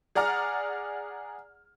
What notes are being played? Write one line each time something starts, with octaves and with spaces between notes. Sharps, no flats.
G#4 D5 F#5 A#5 F6